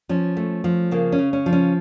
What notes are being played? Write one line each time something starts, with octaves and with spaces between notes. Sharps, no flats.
F3 C#4
A3
F3
C#3 A#3
C#4
C#3
C#4
F3
C#4